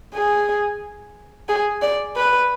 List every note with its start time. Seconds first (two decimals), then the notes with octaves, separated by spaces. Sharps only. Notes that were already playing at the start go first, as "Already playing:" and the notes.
0.14 G#4
1.49 G#4
1.82 D5
2.16 B4